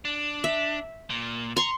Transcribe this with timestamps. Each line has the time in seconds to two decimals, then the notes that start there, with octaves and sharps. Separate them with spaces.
0.05 D4
0.44 E5
1.10 A#2
1.57 A#5 C6 C#6